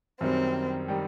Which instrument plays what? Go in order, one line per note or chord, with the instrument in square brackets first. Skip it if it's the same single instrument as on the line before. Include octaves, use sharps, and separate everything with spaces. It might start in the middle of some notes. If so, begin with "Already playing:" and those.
[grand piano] F#2 D#3 G3 [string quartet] C4
[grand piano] D#3 G3